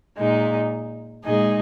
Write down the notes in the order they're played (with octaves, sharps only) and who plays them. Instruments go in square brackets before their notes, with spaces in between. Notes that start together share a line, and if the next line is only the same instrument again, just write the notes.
[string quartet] A#2 G#3 D#4
A#2 G#3 D#4 G#4 D#5